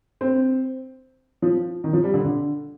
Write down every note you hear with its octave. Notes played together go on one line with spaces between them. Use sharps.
C4
F3
D#3
F3
G3
D3
D3